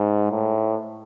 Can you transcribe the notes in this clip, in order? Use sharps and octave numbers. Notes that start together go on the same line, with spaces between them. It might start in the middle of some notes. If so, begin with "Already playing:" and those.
Already playing: G#2
A2